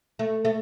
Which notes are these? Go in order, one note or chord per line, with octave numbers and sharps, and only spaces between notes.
A3
A3